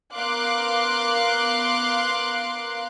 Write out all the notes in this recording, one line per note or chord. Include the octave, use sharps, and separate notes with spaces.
B3 A#4 F5 C6 D6 F#6